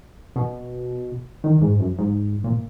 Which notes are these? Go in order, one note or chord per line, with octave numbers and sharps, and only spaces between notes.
B2
D#3
G#2
F#2
G#2
A#2